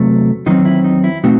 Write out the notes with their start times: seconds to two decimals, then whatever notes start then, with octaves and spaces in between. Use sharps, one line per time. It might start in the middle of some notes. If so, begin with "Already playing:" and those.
Already playing: E2 C3 F#3 A3
0.46 E2 D#3 F#3 C4 D#4
0.65 E4
0.84 D#4
1.04 E4
1.23 B2 A3 C4 D#4 F#4